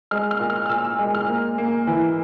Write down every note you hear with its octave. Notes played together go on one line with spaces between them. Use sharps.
G#3 F6
F6
A#2
F6
F6
A#2 E6
E6
G#3
F6
A#3
A#3
E3